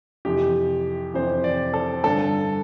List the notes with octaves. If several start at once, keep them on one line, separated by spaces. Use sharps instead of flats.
F2 C3 E3 G4
F2 C3 E3 C5
D5
A4
G2 D3 A4